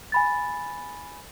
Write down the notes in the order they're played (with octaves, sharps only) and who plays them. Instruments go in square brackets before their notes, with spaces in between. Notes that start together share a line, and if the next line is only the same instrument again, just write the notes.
[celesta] G#5 B5 A6